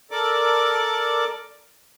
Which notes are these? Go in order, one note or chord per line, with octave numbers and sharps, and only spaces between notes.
A4 A#4 D5 D6